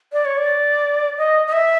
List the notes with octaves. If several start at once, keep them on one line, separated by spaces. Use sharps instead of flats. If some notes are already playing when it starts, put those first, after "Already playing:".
D5
C#5
D5
D#5
D#5
E5